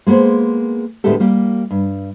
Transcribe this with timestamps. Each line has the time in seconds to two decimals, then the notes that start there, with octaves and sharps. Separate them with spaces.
0.07 G#3 A#3 B3 G#4 C5
1.04 D2 A2 G#3 B3 G4 A4
1.20 G3 A#3 G4
1.71 G2